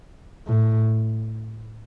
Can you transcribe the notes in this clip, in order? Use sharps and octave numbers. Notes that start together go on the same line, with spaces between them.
A2